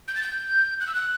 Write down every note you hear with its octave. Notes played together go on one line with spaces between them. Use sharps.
G6
A6
G6
F#6
E6
F#6